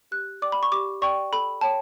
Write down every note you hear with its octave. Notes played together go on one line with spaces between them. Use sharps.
G4 F#6
D5 G5 D6
B5
C#6
G4 D6
D5 G5 C#6
A4 B5
C#5 G5 A5